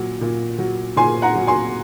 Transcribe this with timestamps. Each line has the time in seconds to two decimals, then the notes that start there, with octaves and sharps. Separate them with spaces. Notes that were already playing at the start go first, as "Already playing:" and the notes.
Already playing: A#2 F#3
0.21 A#2
0.58 F#3
0.96 A#2 G#5 C6
1.22 F#5 A#5
1.35 F#3
1.47 G#5 C6